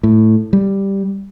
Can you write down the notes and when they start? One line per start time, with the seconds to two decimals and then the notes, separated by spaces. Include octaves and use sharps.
0.03 A2
0.53 G3